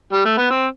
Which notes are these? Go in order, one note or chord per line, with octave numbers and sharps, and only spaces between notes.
G3
A3
B3
C4